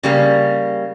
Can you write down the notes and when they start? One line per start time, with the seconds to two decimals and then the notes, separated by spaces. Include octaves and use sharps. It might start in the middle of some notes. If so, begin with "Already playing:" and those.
0.03 C#3 G3 A#3